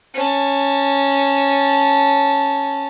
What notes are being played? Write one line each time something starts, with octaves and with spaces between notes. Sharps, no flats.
C#4 A5